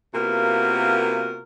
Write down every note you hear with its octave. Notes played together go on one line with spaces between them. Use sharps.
C3 A#3 B3 F4 F#4 A#4